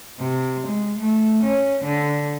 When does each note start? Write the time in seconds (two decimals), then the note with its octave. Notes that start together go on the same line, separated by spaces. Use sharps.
0.19 C3
0.67 G#3
0.98 A3
1.43 C#4
1.84 D3